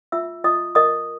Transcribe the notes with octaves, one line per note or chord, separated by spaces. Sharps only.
F4 E5 E6
F4 D#5 D#6
A#4 D#5 D#6